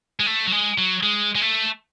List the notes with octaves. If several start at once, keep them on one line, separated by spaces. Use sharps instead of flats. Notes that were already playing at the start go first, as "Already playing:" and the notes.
G#3
A3
F#3
G#3
F#3
G#3
G#3
A3